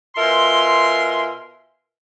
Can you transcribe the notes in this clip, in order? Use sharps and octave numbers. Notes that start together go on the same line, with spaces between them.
B2 F4 A#4 E5 G#5 C6